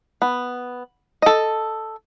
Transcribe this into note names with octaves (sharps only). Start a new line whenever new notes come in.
B3
A4 D#5